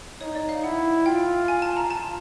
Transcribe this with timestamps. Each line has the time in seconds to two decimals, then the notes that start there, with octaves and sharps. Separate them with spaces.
0.21 D#4 C#5
0.35 D5
0.49 F5
0.63 E4 F#5
1.06 F4 G5
1.48 G#5
1.62 A5
1.77 A#5
1.90 A5